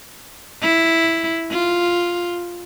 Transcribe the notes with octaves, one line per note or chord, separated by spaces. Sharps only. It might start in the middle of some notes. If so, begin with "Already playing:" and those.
E4
F4